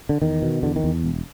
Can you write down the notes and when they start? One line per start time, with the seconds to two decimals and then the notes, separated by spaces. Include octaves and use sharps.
0.09 D3
0.22 E2 D#3
0.42 B2
0.63 E2 D3
0.76 D#3
0.84 E2
1.04 E1